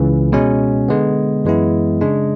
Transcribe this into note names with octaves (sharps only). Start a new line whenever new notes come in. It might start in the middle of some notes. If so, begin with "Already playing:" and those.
Already playing: C#2 C#3 E3
B2 G#3 C#4
D3 G#3 B3
F#2 E3 G#3 B3 E4
C#3 G#3 D4